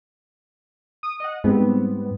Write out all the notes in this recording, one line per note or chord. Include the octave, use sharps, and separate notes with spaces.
D#6
D#5 F#5
G#2 G3 B3 C4